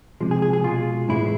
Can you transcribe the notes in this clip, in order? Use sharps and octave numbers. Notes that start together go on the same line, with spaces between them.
C3 F3 G#3
G#4
G#4
G#4
B2 G#3 F4
A2 E3 G#3 E4